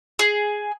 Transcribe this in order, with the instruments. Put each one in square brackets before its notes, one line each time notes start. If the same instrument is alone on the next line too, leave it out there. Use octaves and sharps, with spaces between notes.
[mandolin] G#4